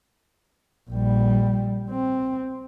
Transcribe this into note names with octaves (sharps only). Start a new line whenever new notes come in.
A#1 G3
C4